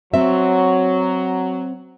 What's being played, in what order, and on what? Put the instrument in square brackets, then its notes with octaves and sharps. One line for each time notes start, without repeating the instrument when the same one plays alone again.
[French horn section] F#3 [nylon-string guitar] C4 E5